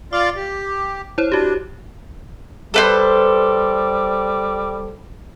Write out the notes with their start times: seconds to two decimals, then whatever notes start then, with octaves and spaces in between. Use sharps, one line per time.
0.13 F4 D5 F5 D6
0.36 G4
1.18 E4 C5 C#5
1.32 D4 F#4 G4
2.74 G3 A4 B4 C5